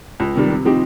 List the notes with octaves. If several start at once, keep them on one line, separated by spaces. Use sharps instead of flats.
C#2
C3 D#3 G3
C3
F3 C4 D#4 G4